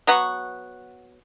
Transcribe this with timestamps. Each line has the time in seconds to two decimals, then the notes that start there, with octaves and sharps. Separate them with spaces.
0.07 F#3 B3 F#5 C#6